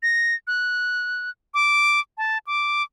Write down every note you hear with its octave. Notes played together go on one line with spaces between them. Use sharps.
A#6
F#6
D6
A5
D6